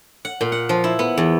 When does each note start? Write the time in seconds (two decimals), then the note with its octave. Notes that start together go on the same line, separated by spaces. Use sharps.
0.25 F#5
0.41 A#2
0.52 F#5
0.69 F3
0.84 E4
0.99 B3
1.18 E2